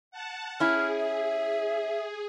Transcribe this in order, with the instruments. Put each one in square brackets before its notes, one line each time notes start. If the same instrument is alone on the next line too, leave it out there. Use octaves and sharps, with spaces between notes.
[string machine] F#5 A5
[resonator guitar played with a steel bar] C#4 E4 [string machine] G#4 [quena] F6
[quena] E5